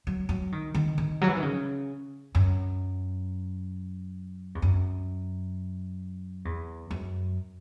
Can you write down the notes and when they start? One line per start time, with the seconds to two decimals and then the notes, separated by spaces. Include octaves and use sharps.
0.07 F#3
0.29 F#3
0.52 D#3
0.74 D#3
0.98 D#3
1.21 F#3
1.28 E3
1.36 D#3
1.42 C#3
2.35 F#2
4.55 E2
4.62 F#2
6.45 E2
6.91 F#2